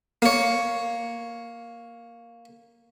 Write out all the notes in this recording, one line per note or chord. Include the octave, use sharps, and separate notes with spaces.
A#3 C#5